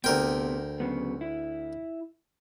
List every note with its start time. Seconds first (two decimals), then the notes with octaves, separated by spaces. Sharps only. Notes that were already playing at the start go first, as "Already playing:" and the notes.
0.04 D2 C3 B3 A#4 G5
0.80 C#3 F#3 B3
1.21 E4